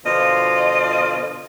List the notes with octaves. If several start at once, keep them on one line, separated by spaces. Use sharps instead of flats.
B2 D3 F3 F4 D#5 F5